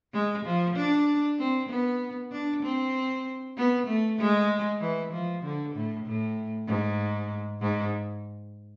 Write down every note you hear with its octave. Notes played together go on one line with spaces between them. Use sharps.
G#3
F3
D4
C4
B3
D4
C4
B3
A3
G#3
E3
F3
D3
A2
A2
G#2
G#2